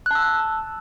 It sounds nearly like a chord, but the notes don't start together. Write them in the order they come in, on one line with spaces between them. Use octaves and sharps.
F#6 A5 E6